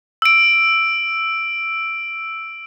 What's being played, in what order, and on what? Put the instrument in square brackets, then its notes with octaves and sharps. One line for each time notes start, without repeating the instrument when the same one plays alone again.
[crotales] E6 D7